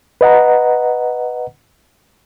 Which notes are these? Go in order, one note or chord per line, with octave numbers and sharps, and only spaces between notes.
B4 D#5 F#5 A#5